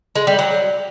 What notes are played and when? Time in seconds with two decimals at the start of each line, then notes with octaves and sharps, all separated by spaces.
0.16 G#3
0.27 G3
0.39 F#3